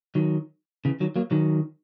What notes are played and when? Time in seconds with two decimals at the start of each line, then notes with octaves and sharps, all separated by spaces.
0.15 D#3 F#3
0.85 C#3 E3
1.00 D#3 F#3
1.16 F#3 A#3
1.31 D#3 F#3